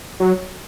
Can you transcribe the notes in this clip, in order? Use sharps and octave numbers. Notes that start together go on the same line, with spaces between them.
F#3